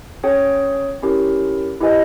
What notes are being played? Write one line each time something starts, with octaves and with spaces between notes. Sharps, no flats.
C#4 G#4 C#5 G5
C#4 E4 G4 A#4
E4 G4 B4 D#5 G#5